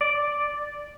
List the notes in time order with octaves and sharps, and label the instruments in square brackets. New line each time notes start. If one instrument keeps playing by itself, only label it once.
[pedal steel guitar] D5